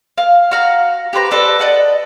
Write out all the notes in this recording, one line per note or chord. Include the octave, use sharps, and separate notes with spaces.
F5
F#4 F5 A#5
G4 B4 C5 A#5
D4 A4 B4 C5
D5 D#5 F#5 A5